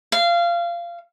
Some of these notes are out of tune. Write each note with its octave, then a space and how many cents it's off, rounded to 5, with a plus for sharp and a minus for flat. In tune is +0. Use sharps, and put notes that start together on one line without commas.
F5 -20